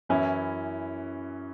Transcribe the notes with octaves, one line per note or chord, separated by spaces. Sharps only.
F#2 E3 C#4 E4